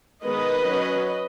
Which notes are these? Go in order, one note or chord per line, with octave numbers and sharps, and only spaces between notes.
D#3 G#3 B3 B4 D#5
F#3 C#4